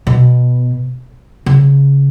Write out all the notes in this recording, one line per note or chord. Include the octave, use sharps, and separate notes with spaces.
B2
C#3